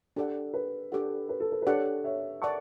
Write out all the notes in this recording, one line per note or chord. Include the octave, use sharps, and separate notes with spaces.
D4 G4 A4 D5 F#5
B4
D4 G4 A4 D5 F#5
B4
A4
B4
B4
D4 G4 A4 C#5 D5 F#5
C#5 E5
D5 F#5 A5 C#6